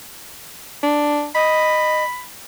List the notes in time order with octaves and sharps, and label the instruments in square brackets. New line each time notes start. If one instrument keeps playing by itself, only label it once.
[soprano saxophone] D4
[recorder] D#5 [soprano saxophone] B5